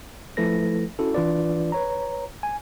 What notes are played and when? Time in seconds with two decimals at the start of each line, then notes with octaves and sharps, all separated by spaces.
0.37 F3 A3 E4 A4 B4 A#6
0.99 C#4 E4 F#4 A4
1.14 E3 D4 F4 B4 D5
1.72 B4 C#5 A#5
2.43 G#5